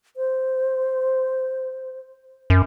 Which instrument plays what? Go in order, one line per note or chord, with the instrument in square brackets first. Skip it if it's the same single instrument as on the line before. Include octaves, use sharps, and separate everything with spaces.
[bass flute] C5
[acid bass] F#2